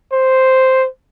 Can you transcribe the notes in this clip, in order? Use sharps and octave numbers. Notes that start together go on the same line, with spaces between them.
C5